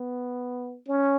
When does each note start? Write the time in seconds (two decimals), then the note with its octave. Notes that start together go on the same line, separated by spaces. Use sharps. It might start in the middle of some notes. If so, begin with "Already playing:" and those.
Already playing: B3
0.88 C#4